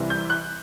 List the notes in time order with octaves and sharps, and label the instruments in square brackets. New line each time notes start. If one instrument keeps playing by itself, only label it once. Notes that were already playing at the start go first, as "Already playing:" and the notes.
Already playing: [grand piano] C2 C3 E3 G3
G6
F#6